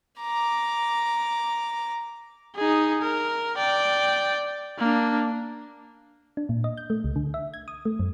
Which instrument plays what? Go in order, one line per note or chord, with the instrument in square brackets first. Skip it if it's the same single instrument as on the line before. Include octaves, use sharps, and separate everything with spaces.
[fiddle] A#5 D6
[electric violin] D#4 G#4
A#4
D5 G5
A#3 D4
[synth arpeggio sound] D4
A#2
D#5
G6
A3
C#2
D3
E5
G#6
D#6
A3
F#2